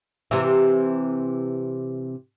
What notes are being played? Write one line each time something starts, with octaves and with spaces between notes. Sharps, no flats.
C3 E3